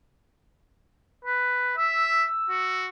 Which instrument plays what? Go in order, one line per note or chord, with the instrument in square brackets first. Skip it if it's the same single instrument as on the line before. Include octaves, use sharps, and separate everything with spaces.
[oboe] B4
[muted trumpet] E5 [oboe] E6
[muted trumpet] F#4